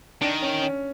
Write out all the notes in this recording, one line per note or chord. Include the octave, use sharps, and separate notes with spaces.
D#3 D4
C#4
C#4